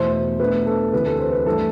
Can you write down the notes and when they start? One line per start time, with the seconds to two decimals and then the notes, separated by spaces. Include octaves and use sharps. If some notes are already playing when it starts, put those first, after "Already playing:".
Already playing: E2 B2 A3 E4 C5
0.13 C5
0.40 B2 A3 D4 B4
0.67 A4
0.93 D2 C3 E3 A3 B4
1.06 A4
1.19 C5
1.32 B4
1.46 G2 E3 A3 D4 A4